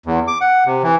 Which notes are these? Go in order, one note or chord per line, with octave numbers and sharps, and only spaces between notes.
E2
D6
F#5
C3
E3